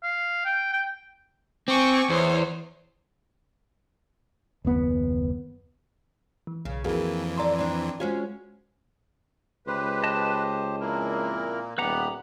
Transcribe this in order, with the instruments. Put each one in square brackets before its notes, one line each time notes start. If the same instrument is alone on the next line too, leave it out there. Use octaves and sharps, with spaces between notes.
[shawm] F5
G5
G5
[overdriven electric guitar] C4 [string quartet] G#5 C#6 D6
[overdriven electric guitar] E2 [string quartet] C5 C#5
[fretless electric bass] F#1 D#2 B3
[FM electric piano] E3
[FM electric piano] B1 [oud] C#3
[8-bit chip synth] F2 E3 [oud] A#3 [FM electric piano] F#4 G#4 A#4
[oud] A4 D5 [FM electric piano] A#5 C6
[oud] C4 D4
[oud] G#3 C#4 G#4 [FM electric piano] F4 F#4 C5
[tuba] C#2 [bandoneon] G4 C5 [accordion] B4
[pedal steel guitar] D#5 A5
[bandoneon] F2 E4 A#4 [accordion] A#2 A#3
[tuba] D#1 [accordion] B3 [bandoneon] G4 B5 [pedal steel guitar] B4 F#5 A#5